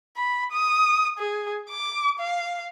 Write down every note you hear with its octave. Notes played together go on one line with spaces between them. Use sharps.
B5
D#6
G#4
D6
F5